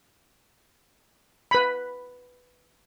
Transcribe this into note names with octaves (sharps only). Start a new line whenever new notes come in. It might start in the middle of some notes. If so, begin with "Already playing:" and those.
B4 B5